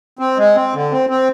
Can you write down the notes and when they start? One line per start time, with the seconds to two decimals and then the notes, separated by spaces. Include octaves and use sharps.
0.19 C4
0.37 G#3
0.55 C4
0.74 D3
0.91 C4
1.09 C4